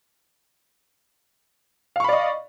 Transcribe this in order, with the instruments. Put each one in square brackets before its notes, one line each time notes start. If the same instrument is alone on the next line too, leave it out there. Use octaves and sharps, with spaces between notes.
[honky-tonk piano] F5
C#6
B5
D5
D#5